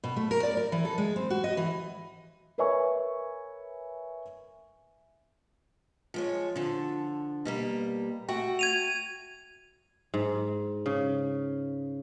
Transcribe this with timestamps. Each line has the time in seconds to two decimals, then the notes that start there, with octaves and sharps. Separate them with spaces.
0.04 B2
0.16 A3
0.31 A#4
0.43 D5
0.57 A#4
0.72 E3
0.85 A4
0.98 G#3
1.16 C4
1.30 F#4
1.44 D#5
1.57 E3
2.58 A#4 B4 C#5 E5 G#5 C#6
6.14 F3 G#3 C#5
6.56 D3 F3
7.45 B2 G3 A#3
8.28 A3 F#4 G5
8.59 G#6 D#7 F7
10.14 G#2
10.86 C#3